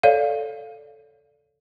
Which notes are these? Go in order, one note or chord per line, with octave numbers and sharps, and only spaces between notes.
A4 C#5 D5 F5